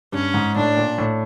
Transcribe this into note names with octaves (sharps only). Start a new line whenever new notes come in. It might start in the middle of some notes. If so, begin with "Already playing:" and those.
G2 C#4
G#2
A2 D4
A#2
A2